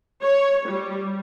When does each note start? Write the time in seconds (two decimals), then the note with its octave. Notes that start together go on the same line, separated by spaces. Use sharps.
0.22 C#5
0.68 G3